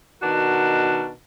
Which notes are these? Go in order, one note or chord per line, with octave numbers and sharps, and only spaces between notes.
B2 D#3 D4 F#4 A#4